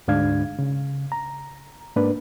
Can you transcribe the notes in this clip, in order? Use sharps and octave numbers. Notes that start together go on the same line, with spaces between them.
D2 G#2 D4 F5 G#6
C#3
A#5
G#2 A#3 D4 B4